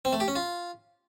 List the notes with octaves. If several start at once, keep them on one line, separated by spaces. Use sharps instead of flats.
C4
A3
G4
C#4
F4